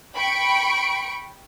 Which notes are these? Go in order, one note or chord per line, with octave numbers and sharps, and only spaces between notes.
G5 B5 C#6 D7